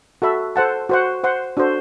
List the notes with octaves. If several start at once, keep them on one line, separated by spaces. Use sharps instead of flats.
F#4 A4 E5 B5
A4 C5 F#5 A5
F#4 C5 F#5
C5 F#5 C6
D4 F#4 A4 C5